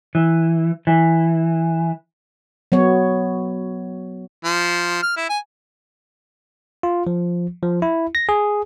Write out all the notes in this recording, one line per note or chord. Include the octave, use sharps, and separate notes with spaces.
E3
E3
F#3 B3 C#5
F3
F6
E4
G#5
F4
F3
F3
E4
A#6
G#4